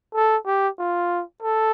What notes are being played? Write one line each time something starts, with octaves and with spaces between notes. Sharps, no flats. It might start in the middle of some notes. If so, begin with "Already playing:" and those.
A4
G4
F4
A4